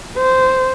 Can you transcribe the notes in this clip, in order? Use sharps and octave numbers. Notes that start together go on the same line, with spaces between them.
C5